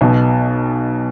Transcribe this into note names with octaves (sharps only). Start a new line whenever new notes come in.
B1 B2